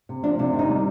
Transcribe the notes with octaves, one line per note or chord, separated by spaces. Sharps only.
C3
F3 D4
C3 D4
D#3
D#4
G3